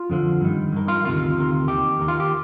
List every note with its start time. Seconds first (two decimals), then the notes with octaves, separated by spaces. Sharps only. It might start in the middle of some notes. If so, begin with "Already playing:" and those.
Already playing: F4
0.10 F2 D3 F3
0.41 G2 D#3
0.72 G2 D#3
0.88 F4
1.05 D2 C3 D#3 F4
1.37 D2 C3 D#3
1.68 D#2 D#3 G4
2.00 D#2 D#3
2.08 F4
2.20 G4